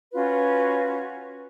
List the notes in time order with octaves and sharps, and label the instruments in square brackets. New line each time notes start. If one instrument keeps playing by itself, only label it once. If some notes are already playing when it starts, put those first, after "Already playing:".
[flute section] C#4 F4 F#4 B4